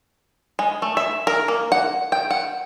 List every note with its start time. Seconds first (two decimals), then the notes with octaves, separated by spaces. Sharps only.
0.59 G#3
0.82 A3
0.97 E5
1.27 A#4
1.48 A#3
1.72 F#5
2.12 G5
2.30 F#5